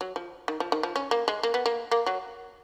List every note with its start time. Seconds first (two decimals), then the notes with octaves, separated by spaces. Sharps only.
0.01 F#3
0.16 F3
0.48 D#3
0.60 F3
0.72 D#3
0.83 F3
0.96 C#4
1.11 A#3
1.28 G#3
1.43 A#3
1.54 B3
1.66 A#3
1.91 A#3
2.06 F#3